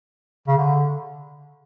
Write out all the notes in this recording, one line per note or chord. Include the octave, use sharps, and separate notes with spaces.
C#3
D3